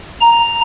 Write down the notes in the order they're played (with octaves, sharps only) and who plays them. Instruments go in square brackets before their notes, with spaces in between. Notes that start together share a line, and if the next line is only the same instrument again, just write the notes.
[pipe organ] A#5